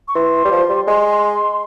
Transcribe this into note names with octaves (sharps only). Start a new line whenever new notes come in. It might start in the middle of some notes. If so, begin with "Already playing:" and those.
C#6
E3 C6
G3
F3
G3
G#3 C6